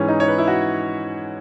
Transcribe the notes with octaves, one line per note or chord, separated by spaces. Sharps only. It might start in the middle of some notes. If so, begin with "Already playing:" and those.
Already playing: G#2 E3 C#4
D#4
C#5
B4
E4
F#4